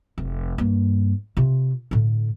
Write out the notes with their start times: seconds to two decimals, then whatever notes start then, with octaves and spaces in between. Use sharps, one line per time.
0.18 F1
0.58 G2 A#3
1.37 C3 F4
1.91 A2 D3